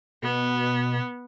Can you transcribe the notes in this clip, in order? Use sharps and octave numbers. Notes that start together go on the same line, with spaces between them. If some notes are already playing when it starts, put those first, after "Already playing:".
B2 B3